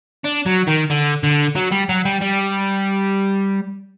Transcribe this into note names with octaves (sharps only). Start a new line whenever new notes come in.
D4
F#3
D#3
D3
D3
F#3
G3
F#3
G3
G3